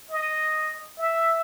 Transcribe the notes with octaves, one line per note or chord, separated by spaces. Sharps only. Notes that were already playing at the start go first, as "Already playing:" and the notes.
D#5
E5